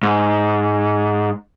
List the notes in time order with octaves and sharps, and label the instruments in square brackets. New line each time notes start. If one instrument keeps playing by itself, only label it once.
[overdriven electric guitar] G#2